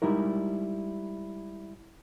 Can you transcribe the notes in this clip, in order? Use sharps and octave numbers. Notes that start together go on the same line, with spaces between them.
G3 G#3 D#4 E4 A#4